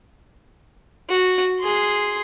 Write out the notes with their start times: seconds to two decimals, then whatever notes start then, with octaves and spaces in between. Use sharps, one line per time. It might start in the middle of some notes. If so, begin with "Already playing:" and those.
1.10 F#4
1.60 G#4 C6